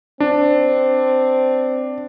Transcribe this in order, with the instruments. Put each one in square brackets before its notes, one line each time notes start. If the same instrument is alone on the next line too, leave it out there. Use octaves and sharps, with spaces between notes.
[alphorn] C4 [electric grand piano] D4